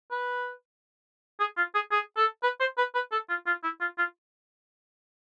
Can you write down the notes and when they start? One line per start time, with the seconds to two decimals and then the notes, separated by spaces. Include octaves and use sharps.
0.11 B4
1.40 G#4
1.57 F4
1.75 G#4
1.91 G#4
2.17 A4
2.43 B4
2.60 C5
2.78 B4
2.95 B4
3.12 A4
3.29 F4
3.46 F4
3.63 E4
3.81 F4
3.98 F4